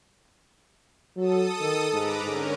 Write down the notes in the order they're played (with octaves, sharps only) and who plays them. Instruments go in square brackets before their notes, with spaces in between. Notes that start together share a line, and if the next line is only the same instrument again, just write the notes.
[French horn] F#3 [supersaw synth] A4 D#6
[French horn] D#3
[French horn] G#2 [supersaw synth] B4 A#5 D6
[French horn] G#2 [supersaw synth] D3 C#4 A#4